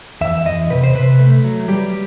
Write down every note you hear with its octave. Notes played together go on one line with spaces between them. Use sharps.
E2 E5
E2 D#5
C3 B4
C5
C3 B4
A3
F#3
G3 G4